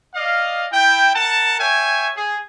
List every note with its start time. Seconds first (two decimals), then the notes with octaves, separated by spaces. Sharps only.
0.15 D5 D#5 F5
0.72 E4 G5
1.15 A#4 F#5 A5
1.59 C#5 E5 G5 G#5
2.15 G#4